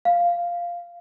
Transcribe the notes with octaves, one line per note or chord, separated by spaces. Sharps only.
F5